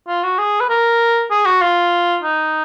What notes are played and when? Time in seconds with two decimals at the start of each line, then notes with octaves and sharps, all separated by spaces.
0.08 F4
0.24 F#4
0.39 G#4
0.61 B4
0.70 A#4
1.31 G#4
1.46 F#4
1.62 F4
2.23 D#4